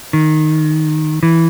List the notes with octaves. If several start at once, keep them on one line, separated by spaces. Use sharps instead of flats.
D#3
E3